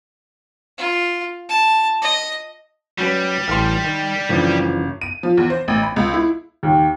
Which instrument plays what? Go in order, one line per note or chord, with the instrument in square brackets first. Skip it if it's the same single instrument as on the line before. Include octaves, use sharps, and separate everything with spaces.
[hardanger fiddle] F4
A5
D#5
[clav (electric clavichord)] F#3 C#4 B4 [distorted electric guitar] G3
[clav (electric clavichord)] A1 E3 A4 [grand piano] C6 F6
[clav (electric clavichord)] D#3
[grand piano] F#1 [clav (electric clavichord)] D3 E3 F3
[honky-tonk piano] D#7
F3
E2
C5
A1
B5
C#2
E4
[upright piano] D#2